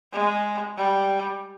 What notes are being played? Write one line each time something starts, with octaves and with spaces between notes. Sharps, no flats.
G#3
G3